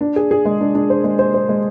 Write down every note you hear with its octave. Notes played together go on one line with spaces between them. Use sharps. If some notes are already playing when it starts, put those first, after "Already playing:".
D4
G#4
G#4
G#3
D4
D4
C5
G#3
C5
C5
G#3